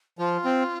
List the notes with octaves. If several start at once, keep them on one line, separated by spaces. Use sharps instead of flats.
F3 F4
C4